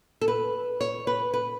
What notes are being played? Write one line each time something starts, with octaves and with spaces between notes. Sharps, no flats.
A4
B4
C#5
B4
B4